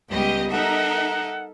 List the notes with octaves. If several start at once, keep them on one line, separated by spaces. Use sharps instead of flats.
C#2 G3 B3 G4 D#5
D#4 A4 A#4 E5 F#5